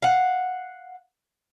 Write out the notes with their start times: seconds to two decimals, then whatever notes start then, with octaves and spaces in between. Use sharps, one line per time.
0.02 F5 F#5